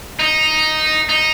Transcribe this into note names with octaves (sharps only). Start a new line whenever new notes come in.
D#4
D#4